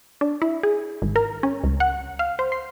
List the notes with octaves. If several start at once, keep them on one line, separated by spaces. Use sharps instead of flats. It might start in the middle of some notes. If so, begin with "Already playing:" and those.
D4
E4
G#4
G#1
A#4
C#4
C#2
F#5
F5
C5
C6